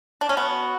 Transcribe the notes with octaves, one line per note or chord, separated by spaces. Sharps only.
D4
C#4
B3 F#4